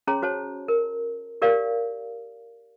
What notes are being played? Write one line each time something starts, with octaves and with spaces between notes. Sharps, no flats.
C#4 G#4 C#5 A#5 C6
F#4 C5 C#5 A5
A#4
G4 A#4 D5 F5